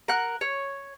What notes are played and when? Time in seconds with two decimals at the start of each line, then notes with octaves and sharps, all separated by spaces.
0.08 A#4 F#5 F#6
0.41 C#5